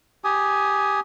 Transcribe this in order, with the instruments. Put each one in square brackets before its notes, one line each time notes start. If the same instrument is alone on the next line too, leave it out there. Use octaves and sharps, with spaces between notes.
[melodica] G4 G#5 D#6